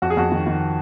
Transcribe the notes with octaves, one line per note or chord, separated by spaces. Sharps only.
F2 F#4
G#4
F2 F#4
D#3
D#3